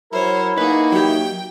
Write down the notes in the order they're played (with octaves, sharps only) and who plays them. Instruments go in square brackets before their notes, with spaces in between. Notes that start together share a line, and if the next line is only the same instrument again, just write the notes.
[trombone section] F#3 A#4 [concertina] E4 [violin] C5 C#5
[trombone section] A#3 D#4 [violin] F#4 G#4 [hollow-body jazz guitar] B4
[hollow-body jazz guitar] F#3 G4 [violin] G5